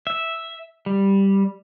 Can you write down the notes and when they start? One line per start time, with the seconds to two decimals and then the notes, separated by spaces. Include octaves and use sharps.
0.07 E5
0.86 G3